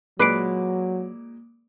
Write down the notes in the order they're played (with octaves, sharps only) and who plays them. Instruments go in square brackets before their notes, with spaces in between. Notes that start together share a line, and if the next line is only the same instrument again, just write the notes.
[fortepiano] A#2 G#3 [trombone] F#3 [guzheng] B4 [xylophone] D6 C7 D7